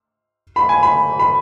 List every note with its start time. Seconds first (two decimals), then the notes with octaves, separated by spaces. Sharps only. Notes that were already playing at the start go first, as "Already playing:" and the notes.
0.56 B5
0.69 G#5
0.83 B5
1.19 B5